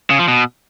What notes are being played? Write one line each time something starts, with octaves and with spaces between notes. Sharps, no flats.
C#3
F3
B2